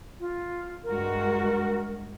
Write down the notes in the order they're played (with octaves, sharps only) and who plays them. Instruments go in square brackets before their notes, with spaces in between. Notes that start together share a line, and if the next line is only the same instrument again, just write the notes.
[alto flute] F4
[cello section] G2 G#3 F#4 [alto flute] A#4